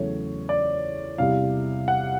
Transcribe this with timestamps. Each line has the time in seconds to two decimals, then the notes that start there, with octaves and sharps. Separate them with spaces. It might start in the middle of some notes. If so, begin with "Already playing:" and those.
Already playing: E2 C#3 F#3 A3 C#5
0.49 D5
1.18 E2 C3 E3 G3 F5
1.88 F#5